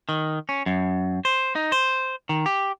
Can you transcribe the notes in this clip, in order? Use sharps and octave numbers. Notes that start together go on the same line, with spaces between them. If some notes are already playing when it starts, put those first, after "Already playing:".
D#3
C#4
F#2
C5
D#4
C5
D#3
G4